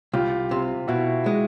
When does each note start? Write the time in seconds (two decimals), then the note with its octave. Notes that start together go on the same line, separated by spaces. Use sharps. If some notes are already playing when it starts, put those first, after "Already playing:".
0.13 C2 F4 G4
0.51 C3
0.88 B2 E4 F#4
1.26 G#3